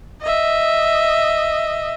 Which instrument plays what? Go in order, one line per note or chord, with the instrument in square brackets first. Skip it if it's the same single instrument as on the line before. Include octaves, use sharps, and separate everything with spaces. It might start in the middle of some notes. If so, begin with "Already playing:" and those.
[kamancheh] D#5 E5